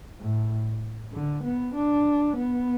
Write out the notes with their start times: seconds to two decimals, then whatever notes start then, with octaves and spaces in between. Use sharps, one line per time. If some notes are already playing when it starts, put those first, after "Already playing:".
0.20 A2
1.13 D3
1.44 B3
1.75 D4
2.37 B3